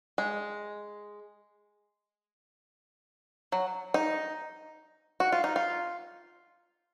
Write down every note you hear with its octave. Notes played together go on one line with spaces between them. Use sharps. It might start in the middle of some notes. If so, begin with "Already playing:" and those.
G#3
F#3
D#4
F#4
F4
D#4
F4